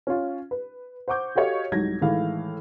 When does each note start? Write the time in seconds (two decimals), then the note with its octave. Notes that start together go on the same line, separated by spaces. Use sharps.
0.07 C#4 F4
0.51 B4
1.08 C5 F#5 C#6 D6 G6
1.35 F#4 G4 A4 C#5 D#5 F5
1.72 C2 G#2 F#3 G#6 A#6
2.02 A2 D#3 E3 G#3 F5